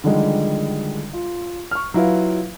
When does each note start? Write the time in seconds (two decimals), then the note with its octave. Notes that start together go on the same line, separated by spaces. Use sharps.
0.04 D3 D#3 F3 G3 G#3
1.13 F4
1.71 C#6 F6
1.94 F#3 E4 F4 B4 F5